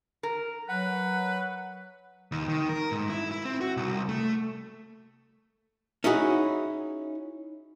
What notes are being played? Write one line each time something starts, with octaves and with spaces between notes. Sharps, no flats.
A#4
F#3 B4 F#5
D#2
D#3
A#4
G#2
E4
E4
C4
F#4
C2
A3
C#4 D#4 E4 F#4 G#4